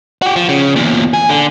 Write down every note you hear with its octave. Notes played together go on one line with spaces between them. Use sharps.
F#4 G4
F3
C#3
E2 A#2
G#4
D3